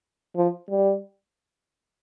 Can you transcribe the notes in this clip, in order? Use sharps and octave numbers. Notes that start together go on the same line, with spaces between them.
F3
G3